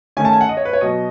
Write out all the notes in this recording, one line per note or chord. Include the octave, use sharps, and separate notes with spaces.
D#3 A3 C#4 G#5
A5
G#5
F#5
D#5
C#5
B4
C#5
B2 F#3 B3 D#5